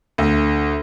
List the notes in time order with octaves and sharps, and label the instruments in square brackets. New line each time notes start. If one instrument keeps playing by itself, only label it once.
[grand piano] D2